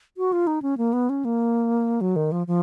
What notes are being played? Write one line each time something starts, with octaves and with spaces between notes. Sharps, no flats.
F#4
F4
D#4
C#4
A#3
B3
C#4
A#3
F#3
D#3
F3
F3